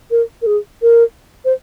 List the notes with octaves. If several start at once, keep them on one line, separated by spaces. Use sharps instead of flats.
A#4
A#4
G#4
A#4
C5